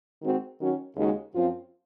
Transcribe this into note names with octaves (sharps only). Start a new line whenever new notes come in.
D#3 G#3 C4 F#4
D#3 F#3 C#4 F#4
D#2 C#3 G#3 D#4 F#4
F#2 F3 C4 F4